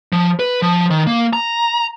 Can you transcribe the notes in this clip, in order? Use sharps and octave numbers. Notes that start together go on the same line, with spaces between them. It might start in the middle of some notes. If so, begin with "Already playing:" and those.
F3
B4
F3
D#3
A#3
A#5